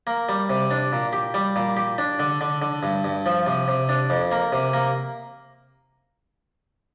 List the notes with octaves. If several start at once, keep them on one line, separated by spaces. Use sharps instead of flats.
A#3
G3
C3
D4
A#2
G4
G3
A#2
G4
D4
D3
D3
D3
G2
G2
F3
C3
C3
D4
F2
A#3
C3
A#3